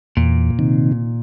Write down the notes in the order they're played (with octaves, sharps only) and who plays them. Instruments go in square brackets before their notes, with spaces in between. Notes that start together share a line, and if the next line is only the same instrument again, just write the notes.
[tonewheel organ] E2 [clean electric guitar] A#2
[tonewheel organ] C3 D#3